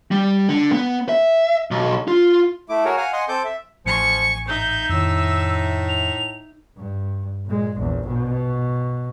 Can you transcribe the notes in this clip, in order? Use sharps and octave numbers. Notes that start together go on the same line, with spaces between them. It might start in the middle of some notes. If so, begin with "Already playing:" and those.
G3
D3
B3
E5
B1
F4
A3 E4 D6
F#4 G#4 A#4 C#5
F5 F#5 G#5
D#5 F#5 G#5 C6
C4 A4 D6 G6
E5
A1 F3 G#5 C#6 C#7
G#2 D#4 E5 G6
F2 A2 D#3 E6
F7
G2
A#2 G#3
A#1 E2
B2